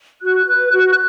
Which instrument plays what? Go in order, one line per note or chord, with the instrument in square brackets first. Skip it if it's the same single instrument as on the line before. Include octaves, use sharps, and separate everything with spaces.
[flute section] F#4 F#6
B4
F#4